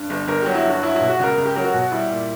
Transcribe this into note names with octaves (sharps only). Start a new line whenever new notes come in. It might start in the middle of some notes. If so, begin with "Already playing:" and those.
Already playing: G2
G1
G1 A#4
F#3 G4
E4
G2 F#4
F#3 E4
E4
B2
F#4
C#2 A#4
C#2 A#4
G4
F#3 A#4
F#4
B2
G3 E4
A#2